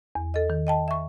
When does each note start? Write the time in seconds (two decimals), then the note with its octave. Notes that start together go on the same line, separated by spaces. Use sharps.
0.15 E2
0.34 A4 D#5
0.50 D#3
0.67 D#5 G5 A5
0.88 E5 C#6